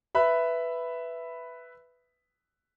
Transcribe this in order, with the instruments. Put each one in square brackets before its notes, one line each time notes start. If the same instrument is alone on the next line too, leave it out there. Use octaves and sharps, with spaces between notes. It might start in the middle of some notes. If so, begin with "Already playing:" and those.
[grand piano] B4 E5 B5